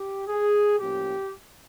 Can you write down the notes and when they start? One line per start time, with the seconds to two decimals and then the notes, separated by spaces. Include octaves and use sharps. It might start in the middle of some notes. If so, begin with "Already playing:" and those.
Already playing: G4
0.27 G#4
0.78 A2 F3 A#3 C#4 G4